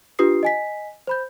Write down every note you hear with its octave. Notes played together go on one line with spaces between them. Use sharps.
D4 F4 G4 B4 D#6 C7
D#5 G#5 B6
C5 B5 G6